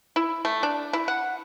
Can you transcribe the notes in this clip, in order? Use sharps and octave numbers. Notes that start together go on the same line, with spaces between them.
E4
A3
D4
E4
F#5